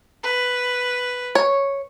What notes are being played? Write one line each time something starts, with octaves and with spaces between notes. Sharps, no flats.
B4
C#5